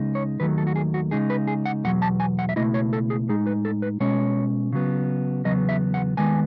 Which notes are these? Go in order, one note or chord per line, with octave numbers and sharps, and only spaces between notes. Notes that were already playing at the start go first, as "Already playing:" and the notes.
Already playing: C#2 C#3 G#3 D#4
C#5
D#2 D#3 F#3 A3 B4
A4
F#4
G#4
F#4
C#3 G#3 D#4 G#4
B4
G#4
F#5
E2 B2 F#3 F#5
A5
G#5
F#5
E5
C#2 B2 A3 E4 D#5
C#5
A4
G#4
A2 G#3 D#4 G#4
B4
A4
B4
B2 G#3 C#4 C#5
C#3 F#3 B3
E2 C#3 F#3 B3 D#5
E5
F#5
D#2 D#3 G#3 B3 G#5